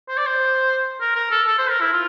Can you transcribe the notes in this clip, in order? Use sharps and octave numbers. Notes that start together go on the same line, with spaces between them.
C5
D5
C5
A#4
A#4
A4
A4
C5
A#4
E4
F4